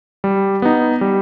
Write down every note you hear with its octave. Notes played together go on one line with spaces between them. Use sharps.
G3
B3 D#4
G3